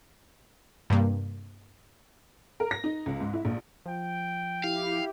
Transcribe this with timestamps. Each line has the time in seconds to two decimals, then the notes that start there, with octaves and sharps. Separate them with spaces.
0.90 G2 C3 G3 A#3
2.60 A#4
2.71 A#6
2.84 D#4
3.06 C#2
3.20 G#2
3.33 E4
3.45 A#1
3.86 F3 G5
4.64 E4 G4 F5